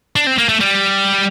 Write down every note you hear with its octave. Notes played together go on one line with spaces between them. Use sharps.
D4
C4
A#3
A3
G3